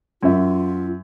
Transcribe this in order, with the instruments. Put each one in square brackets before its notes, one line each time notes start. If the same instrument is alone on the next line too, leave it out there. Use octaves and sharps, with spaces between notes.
[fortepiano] F#2 E5 [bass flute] F4